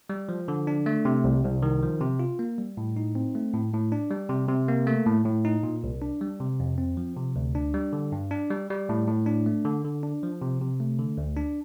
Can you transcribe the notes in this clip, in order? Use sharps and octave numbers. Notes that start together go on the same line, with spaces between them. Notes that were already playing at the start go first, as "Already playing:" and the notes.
G3
F3
D3
D4
A3
C3
C2
C2
D#3
F3
C3
F4
A#3
G3
A2
D#4
C4
A3
A2
A2
D4
G3
C3
C3
A#3
A3
A2
A2
D#4
A#2
C2
D4
G3
C3
F2
C4
F3
C3
D2
D4
G3
D3
G2
D4
G3
G3
A2
A2
D4
A3
D3
D3
D4
F3
C3
C3
A3
D3
D2
D4